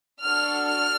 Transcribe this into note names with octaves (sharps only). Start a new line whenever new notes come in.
D4 F#4 A4 F6
F6